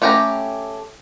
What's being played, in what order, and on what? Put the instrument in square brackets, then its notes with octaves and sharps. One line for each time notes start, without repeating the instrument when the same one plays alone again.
[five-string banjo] A3 C#4 G4 A#4 A#5